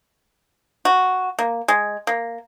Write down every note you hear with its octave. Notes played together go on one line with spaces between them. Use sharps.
F#4
A#3
G#3
A#3